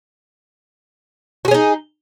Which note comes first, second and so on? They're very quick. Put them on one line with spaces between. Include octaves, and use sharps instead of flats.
F#4 G#4 C#4 D#4